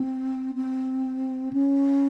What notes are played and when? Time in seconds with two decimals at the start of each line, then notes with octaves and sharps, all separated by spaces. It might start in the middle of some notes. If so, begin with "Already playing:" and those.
Already playing: C4
0.55 C4
1.53 C#4